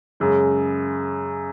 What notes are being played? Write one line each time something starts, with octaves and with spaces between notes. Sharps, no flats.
F#2 C#3 G#3